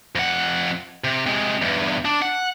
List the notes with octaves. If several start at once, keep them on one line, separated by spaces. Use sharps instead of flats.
F2 F#5
C3
C3 G#3
E2 G2
D4
F#5